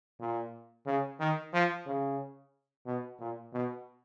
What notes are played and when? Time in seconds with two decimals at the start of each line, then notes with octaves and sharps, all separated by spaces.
0.20 A#2
0.87 C#3
1.20 D#3
1.53 F3
1.87 C#3
2.86 B2
3.20 A#2
3.53 B2